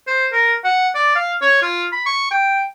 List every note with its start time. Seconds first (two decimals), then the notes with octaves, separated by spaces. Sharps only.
0.07 C5
0.32 A#4
0.65 F#5
0.95 D5
1.16 F5
1.42 C#5
1.62 F4
1.92 B5
2.06 C#6
2.31 G5